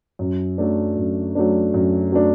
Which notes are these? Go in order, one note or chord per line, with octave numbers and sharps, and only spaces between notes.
F#2
F#3 A3 D4
F#2
F#3 A3 D4
F#2
F#3 A3 D4